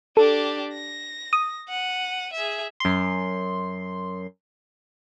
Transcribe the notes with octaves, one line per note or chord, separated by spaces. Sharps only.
D4 G4 A4
A#6
D#6
F#5 D#7
G#4 E5
F#2 C6